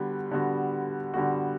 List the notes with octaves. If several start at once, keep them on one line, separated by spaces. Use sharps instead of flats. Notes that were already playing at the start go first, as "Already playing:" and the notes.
Already playing: D3 G3 B3 F#4
D3 G3 B3 F#4
D3 G3 B3 F#4